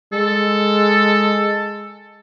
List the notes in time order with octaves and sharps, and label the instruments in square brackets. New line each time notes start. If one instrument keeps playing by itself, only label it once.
[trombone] G#3 [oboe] A4